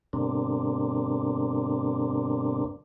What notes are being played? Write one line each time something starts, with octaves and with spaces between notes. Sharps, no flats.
G2 B2 D3 A#3 C4 D4